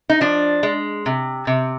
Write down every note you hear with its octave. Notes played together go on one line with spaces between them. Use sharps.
D#4
F3 D4
G#3
C3
C3